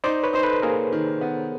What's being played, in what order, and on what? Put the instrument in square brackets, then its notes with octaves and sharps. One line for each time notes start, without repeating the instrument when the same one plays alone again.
[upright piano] D#4 [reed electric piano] C5 D5
[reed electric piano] B4 C#5
[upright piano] D#4 [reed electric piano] C5
[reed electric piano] A4 B4
[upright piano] A#3 [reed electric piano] G#4 A#4
[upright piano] D#3
B3